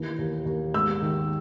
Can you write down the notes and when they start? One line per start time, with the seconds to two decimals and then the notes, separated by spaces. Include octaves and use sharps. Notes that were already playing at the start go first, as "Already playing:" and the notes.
Already playing: D#2 E3
0.18 D#2
0.45 D#2
0.74 G#2 E6
1.02 D#3